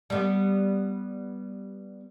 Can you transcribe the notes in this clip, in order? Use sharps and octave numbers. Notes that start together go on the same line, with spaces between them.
G3 B3